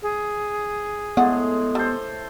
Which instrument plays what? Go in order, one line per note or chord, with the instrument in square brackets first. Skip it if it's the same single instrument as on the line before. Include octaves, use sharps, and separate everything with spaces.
[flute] G#4
[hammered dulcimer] A2 G#3 [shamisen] C#3 D5 F#5 [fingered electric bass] B3
[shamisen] G3 [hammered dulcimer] A4 C5